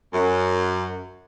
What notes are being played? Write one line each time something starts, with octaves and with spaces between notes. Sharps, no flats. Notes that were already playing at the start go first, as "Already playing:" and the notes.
F#2